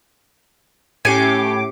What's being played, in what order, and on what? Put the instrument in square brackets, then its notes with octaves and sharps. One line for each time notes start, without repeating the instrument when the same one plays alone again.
[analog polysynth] A2 D6 [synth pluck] C#4 C7 C#7 [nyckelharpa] G4 [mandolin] G#5